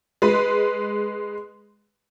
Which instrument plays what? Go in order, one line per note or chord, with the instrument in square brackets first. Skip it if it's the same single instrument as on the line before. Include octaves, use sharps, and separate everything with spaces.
[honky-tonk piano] G#3 B4